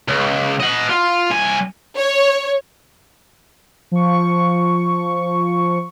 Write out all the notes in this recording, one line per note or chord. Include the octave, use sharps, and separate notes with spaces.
C#2
D#5 F#5
F4
C2 G#5
C#5
F3 C#6